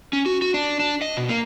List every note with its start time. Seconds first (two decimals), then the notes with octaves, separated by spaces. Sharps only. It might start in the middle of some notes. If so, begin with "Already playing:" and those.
0.13 C#4
0.26 F#4
0.42 F#4
0.54 D4
0.80 D4
1.02 D#5
1.17 B2
1.29 A#3